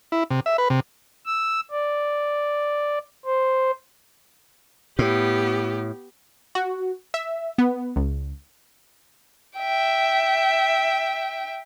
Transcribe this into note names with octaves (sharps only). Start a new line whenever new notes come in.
E4
C3
E5
B4
C3
E6
D5
C5
A2 B3 G4
F#4
E5
B3
C#2
E5 G5